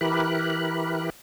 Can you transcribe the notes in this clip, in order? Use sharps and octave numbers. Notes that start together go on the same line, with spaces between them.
E3 E4 G4 A#4 B5 F#6